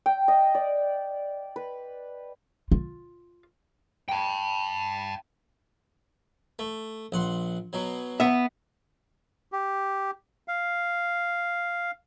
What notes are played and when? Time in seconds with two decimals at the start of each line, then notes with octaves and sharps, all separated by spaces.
0.06 G5
0.28 D#5
0.55 D5
1.56 B4
2.72 F4
4.09 G5 A5
6.59 A3
7.12 A#1 F#5 C6
7.73 B2 F#3
8.20 B3 E5
9.52 G4
10.48 F5